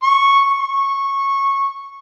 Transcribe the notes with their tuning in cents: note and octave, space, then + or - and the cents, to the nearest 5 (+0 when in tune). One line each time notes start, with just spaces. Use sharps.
C#6 -5
C#6 -15